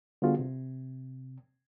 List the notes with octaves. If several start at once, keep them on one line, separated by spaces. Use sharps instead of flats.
D3 G3 B3 F4 F#4 G#4
C3